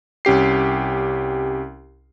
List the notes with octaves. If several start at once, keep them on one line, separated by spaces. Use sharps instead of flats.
C2 C#4 G4 C7